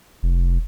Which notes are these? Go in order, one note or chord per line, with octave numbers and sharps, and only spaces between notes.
F1